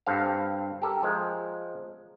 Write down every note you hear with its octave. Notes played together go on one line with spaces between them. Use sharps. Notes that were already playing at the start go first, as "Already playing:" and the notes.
G2 C4 A4 F5
G4 A4 A#4
F3 G#3